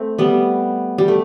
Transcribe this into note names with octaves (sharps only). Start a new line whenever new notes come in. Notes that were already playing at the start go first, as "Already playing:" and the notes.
Already playing: A3 C4
G3 B3
G3
A3